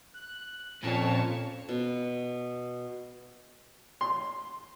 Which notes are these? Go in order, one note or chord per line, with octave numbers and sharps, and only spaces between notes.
F#6
F2 A#2 C#4 C#5 A5
B2
C6